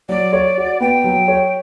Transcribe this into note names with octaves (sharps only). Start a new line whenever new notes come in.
F#3 D5
C#5
F#4
B3 G5
F#3
C#5